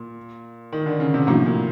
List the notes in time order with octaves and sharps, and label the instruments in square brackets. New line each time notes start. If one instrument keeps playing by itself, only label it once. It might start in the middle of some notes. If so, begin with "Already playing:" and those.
Already playing: [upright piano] A#2
D#3
D3
C#3
C3
[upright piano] A2 [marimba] C3 F3 A#3 D4 F#4
[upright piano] A#2